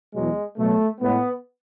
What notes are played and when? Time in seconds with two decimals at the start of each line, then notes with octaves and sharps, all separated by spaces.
0.14 E2 B2 F#3 G#3
0.57 B2 F#3 A3
1.00 A2 G#3 B3